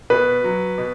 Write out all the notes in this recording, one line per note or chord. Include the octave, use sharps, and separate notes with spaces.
B2 B4
F#3
B2